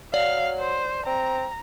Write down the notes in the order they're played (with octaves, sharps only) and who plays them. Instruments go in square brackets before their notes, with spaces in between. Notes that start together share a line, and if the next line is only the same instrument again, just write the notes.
[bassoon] F#3 [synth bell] D5 [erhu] F5
[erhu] C5
[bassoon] C4 [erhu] A#5